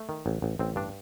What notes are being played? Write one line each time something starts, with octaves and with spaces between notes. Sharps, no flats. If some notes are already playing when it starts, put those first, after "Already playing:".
Already playing: A3
D#3
A1
A1
A1 C4
G2 D4